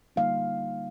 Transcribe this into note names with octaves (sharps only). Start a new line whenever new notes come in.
D3 G3 A#3 D#4 F5